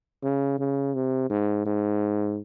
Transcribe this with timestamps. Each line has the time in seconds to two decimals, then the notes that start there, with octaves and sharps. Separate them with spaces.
0.23 C#3
0.59 C#3
0.95 C3
1.30 G#2
1.66 G#2